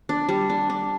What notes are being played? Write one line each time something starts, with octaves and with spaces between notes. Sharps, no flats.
D4
G3
D4
D4